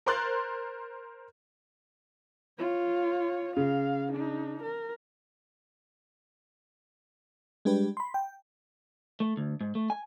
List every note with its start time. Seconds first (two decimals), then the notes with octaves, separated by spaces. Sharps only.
0.06 A#4 C5 C6 F#6 A6
2.59 F4 C#5
3.57 C#3 F5
4.11 D4 D#4
4.62 A#4
7.65 G3 G#3 D4 G4 B4
7.97 B5 C6
8.14 G5
9.20 A3
9.37 D2
9.61 G#2
9.75 A3
9.90 G#5